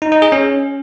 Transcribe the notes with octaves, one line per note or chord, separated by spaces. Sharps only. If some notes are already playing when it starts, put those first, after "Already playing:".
D#4
D#4
G#4
C#4